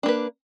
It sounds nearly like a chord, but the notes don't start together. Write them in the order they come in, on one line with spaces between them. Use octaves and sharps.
D4 A#3 B4